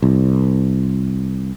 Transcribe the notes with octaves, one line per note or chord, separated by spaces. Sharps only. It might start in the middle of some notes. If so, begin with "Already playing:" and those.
C2